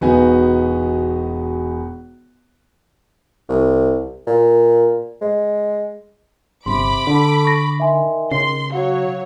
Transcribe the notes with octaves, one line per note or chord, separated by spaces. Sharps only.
E1 B3 D#4 F#4 G#5
C2
A#2
G#3
G1 C3 B5 C6 D6
D3 A4
C#6 A#6
D#3 E5 G#5 C6
C#3 C6 C7
F#3 F#4 C#5 F5